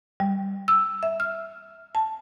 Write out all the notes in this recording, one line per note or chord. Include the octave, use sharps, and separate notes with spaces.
G3
E6
E5
F6
A5